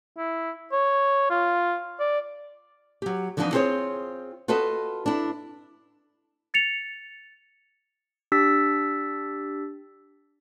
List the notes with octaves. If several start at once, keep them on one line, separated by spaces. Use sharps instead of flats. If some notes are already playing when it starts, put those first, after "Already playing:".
E4
C#5
F4
D5
F#3 G4
D3 E3 F3 B3 D4 D#4
C4 F4 G#4 C5 C#5
F4 F#4 A4 B4 D#5
D4 E4
A6 C#7 F7
D4 G4 E6 A6 B6